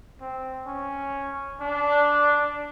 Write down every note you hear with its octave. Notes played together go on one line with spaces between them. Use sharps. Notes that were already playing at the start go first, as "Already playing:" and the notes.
C4
C#4
D4